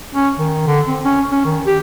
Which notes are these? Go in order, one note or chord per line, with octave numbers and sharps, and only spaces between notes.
C#4
D#3
D3
C4
C#4
C#4
D#3
G4